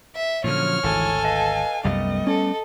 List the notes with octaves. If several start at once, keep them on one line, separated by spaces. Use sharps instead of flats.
E5
A#2 D3 F3 F#3 C#4 C#5 F6
G#1 D2 E3 A4 G#5
B4 D#5 F5
C2 F#2 G3 A3 B3 D#5
C#4 A4